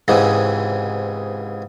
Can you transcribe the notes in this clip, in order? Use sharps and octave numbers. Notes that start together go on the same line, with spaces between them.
C#2 G#2 C3 E3 G#3